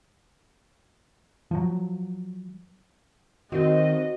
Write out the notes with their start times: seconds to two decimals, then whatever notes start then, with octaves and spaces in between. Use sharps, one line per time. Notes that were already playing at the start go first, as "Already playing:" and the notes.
1.51 F3 F#3
3.52 D#3 C4 F#4 D#5